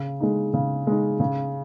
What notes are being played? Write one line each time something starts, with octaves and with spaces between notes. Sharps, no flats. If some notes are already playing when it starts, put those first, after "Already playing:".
Already playing: C#3
G#3 D#4
C#3
G#3 D#4
C#3